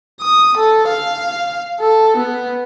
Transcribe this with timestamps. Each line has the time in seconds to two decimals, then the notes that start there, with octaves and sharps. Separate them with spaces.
0.21 D#6
0.57 A4
0.89 F5
1.80 A4
2.17 B3